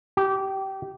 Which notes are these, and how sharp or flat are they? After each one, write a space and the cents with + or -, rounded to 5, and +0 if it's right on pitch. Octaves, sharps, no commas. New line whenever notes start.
G4 -20